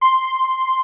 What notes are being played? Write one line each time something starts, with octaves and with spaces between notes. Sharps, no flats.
C6